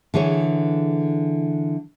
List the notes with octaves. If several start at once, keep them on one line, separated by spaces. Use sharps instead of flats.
D3 E3 G#4 C#5